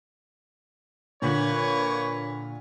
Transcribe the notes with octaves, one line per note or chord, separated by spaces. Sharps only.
A#2 D3 A#3 B4 C#5